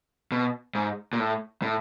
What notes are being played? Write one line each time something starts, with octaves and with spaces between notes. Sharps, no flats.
B2
G#2
A#2
A2
A2